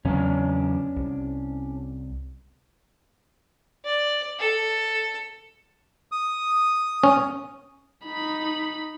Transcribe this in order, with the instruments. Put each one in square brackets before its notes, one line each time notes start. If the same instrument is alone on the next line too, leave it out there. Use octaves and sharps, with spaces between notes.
[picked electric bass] E2 C#3 F#3 [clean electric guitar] C#4 D4
[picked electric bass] C2
[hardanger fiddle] D5
A4
[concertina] D#6
[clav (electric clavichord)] C#4
[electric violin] D#4 B5